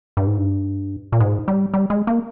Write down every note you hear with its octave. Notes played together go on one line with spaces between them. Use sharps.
G2
G#2
G2
A#2
G#2
G3
G3
G#3
A#3